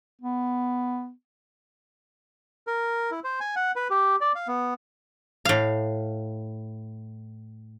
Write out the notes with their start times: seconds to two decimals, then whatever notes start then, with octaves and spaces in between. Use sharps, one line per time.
0.22 B3
2.67 A#4
3.11 E4
3.24 C5
3.40 G#5
3.56 F#5
3.76 B4
3.90 G4
4.21 D5
4.35 F5
4.48 B3
5.45 A2 F5